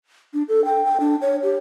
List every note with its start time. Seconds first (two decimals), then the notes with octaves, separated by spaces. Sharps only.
0.34 D4
0.49 A4
0.65 G5
0.85 G5
1.00 D4
1.22 C#5
1.43 G4